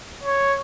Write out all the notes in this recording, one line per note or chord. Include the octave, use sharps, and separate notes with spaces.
C#5